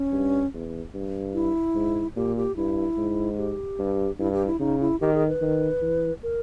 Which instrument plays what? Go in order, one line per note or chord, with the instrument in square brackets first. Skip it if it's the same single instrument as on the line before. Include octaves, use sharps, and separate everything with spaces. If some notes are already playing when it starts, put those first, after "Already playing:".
Already playing: [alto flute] C#4
[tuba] G2
E2
G2
[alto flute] E4
[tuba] G#2
[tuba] A#2 [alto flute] G4
[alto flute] G4
[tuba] G2 [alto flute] E4
[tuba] G#2
[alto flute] G4
[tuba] G2
[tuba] G2 [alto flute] E4
[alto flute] G4
E4
[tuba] C#3 [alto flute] D#4
[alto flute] E4
[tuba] D#3 [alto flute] G4
[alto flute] G#4
B4
[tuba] D#3
E3
[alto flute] A#4